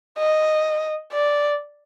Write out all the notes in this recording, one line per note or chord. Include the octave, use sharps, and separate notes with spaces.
D#5
D5